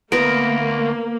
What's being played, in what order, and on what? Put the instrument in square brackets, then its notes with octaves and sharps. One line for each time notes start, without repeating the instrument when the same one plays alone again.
[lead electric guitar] D2 [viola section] A#3 [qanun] B3 A#4 [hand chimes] A#6 D7